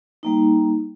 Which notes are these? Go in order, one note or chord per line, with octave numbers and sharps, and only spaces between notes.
G3 A#3 D#4